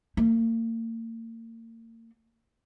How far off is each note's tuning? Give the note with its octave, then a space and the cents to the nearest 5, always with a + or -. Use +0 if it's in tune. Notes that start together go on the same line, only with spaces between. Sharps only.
A#3 -40